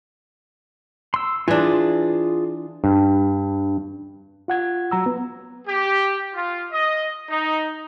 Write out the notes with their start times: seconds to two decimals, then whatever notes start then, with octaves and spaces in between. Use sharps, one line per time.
1.14 C6 E6
1.48 E3 D4 F4 G#4
2.84 G2
4.48 F4 F#5 G#6
4.91 F#3 A#5 E6
5.06 B3
5.67 G4
6.35 F4
6.72 D#5
7.30 D#4